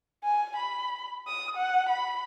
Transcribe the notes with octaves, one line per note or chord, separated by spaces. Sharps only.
G#5
B5
D#6
F#5
B5